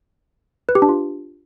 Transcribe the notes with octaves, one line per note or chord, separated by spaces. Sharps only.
B4
G4
D4
F4